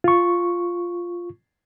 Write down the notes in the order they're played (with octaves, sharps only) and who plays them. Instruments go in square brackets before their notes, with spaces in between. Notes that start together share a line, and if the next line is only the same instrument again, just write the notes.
[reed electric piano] F4 C#6